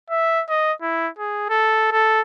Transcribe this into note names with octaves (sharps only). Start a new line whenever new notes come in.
E5
D#5
E4
G#4
A4
A4